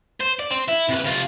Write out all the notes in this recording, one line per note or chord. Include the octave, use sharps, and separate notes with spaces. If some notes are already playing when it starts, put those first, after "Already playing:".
C5
D5
C4
E4
C3 B4
C3 F4